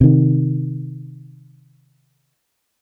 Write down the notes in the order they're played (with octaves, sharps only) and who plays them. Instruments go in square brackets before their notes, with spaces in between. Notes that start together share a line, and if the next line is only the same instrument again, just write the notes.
[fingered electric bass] C3 D#3